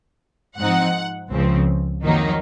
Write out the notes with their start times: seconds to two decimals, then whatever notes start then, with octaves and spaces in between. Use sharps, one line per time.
0.57 G#2 F3 C4 D#4 F#5
1.31 C#2 C#3 F3 C4
2.04 F2 D#3 F#3 A#3 D#4